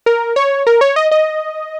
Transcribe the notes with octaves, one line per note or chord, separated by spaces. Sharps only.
A#4
C#5
A#4
C#5
D#5
D#5